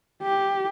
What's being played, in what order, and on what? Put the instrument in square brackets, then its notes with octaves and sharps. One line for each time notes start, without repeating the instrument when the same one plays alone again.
[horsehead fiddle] G4